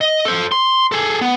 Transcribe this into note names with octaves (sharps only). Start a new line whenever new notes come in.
D#5
A4 C5
C6
G#4 A4
B3